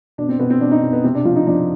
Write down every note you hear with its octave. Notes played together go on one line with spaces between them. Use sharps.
B2 D4
C4
B2 B3
C4
B2 D4
D#4
B2
B3
C3 C4
D4
F3 F4
D#4
F3 D4